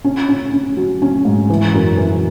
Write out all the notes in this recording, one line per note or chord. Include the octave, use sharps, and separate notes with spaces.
C#4
C#4
C#4
F#3
C#4
G#2
E3
F#2
E3